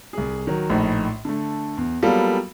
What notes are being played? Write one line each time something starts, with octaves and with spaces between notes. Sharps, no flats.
C2 G#4
D#3 F#3
A#1 A2 D#4
D3 A3
E2
F#3 G3 A#3 B3 F4 A4